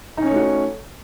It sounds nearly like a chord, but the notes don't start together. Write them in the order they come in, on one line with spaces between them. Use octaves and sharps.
D#4 C#4 C#5 A3 F#4